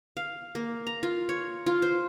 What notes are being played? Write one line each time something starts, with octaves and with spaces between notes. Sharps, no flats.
F5
A#3
A#5
F4
C#5
F4
C5